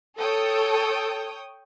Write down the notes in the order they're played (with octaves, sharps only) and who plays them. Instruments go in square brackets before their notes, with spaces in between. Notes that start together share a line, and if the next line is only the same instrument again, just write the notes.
[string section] A4 [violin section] C#5 G5 D#6